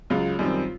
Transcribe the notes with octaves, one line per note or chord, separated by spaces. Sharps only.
C#2 C#3 F#3 F4
F#2 D#3 G3 C4